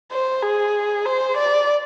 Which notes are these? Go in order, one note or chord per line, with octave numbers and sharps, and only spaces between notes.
C5
G#4
C5
D5